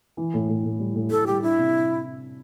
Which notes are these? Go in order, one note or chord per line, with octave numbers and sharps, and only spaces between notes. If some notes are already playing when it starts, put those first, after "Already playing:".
E3
A2
A2
A2
G3
A2
A2 A4
G3 G4
D4 E4
C3